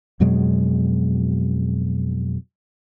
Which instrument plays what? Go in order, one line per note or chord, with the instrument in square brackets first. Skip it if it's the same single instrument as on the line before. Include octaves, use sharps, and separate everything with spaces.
[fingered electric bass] F2 B2 F#3 G#3